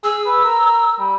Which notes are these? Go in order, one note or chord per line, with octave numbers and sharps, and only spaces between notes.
G#4 E6
B4
A#4
G3